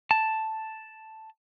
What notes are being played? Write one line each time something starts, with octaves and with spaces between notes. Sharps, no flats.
A5